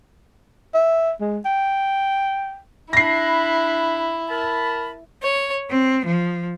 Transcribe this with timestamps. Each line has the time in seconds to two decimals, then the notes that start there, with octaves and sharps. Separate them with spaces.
0.74 E5
1.21 G#3
1.45 G5
2.93 D4 E4 B5 A#6 C7
4.29 A#4 A5 B5
5.22 C#5
5.69 C4
6.05 F3